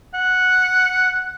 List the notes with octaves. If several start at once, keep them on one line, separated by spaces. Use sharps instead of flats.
F#5